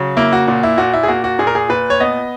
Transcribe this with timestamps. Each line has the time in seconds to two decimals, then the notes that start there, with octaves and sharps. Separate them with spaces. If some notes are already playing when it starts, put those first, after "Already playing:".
Already playing: C#3 F#3
0.17 A#3 E4
0.33 F#4
0.47 A#2 F#4
0.63 E4
0.78 A#2 F#4
0.94 E4
1.03 G#4
1.08 A#3 F#4
1.24 F#4
1.39 A#2 G#4
1.47 A#4
1.55 G#4
1.69 A#2 B4
1.90 C#5
2.00 B3 D#5